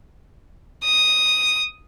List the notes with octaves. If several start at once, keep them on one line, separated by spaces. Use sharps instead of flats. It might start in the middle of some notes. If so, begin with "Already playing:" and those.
D#6